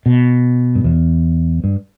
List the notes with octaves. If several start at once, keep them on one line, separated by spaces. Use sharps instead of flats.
B2
G2
E2
G2